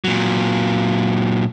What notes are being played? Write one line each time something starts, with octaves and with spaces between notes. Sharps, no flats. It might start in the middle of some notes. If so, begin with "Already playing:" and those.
A#2 F#3